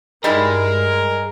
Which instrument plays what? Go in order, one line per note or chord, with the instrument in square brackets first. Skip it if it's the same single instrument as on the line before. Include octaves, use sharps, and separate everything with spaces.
[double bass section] G2 [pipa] G3 D#4 E4 [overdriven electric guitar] G#4 D#5 [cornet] A#4